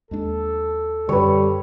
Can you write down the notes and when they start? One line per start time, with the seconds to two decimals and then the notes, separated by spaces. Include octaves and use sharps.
0.11 D#2 G#3 D4 A4
1.09 F#2 D3 G3 B4 C#5